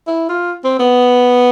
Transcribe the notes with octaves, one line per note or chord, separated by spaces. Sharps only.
E4
F4
C4
B3